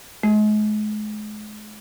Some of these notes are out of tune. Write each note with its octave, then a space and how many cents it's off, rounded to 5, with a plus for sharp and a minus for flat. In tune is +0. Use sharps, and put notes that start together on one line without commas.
G#3 +40